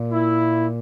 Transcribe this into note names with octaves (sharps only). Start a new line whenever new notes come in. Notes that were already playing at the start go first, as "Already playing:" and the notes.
Already playing: A#2
E4